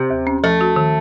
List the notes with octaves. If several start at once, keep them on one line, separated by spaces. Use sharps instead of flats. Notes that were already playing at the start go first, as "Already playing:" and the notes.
Already playing: C3
D#2
C#4
F3 A3
F#4
D#3